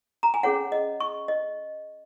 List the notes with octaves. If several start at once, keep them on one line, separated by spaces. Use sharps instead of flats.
A#5
G#5
C#4 G#4 C#5 F#5
D#5
C#6
D#5